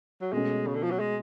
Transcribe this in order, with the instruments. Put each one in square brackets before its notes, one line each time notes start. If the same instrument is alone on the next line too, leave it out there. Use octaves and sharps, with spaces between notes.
[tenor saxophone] F#3
[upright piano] B2 A3 C#4 [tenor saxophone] G#3
[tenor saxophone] C#3
D3
F3
F#3
G#3